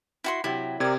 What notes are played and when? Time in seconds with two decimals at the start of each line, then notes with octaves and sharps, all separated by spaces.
0.24 E4 F#4 C6
0.44 C3 F#3 E4 G4
0.80 C3 G4 A#4 D5 G#6